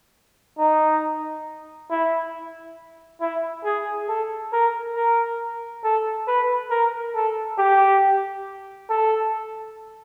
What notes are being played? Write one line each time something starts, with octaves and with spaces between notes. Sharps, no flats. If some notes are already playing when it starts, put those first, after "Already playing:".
D#4
E4
E4
G#4
A4
A#4
A#4
A4
B4
A#4
A4
G4
A4